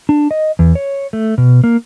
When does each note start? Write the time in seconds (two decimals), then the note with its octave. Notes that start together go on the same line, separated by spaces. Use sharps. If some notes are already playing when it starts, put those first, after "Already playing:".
0.09 D4
0.31 D#5
0.59 E2
0.75 C#5
1.13 A3
1.38 B2
1.64 A#3